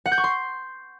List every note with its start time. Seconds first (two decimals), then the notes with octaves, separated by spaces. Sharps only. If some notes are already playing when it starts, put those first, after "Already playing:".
0.06 F#5
0.12 G6
0.18 C#6
0.24 C6